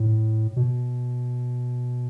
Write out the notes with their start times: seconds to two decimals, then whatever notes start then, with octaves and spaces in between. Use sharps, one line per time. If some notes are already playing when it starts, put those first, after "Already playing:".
Already playing: A2
0.56 B2